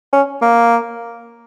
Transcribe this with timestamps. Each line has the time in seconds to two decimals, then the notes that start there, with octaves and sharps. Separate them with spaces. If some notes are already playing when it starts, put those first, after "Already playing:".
0.13 C#4
0.42 A#3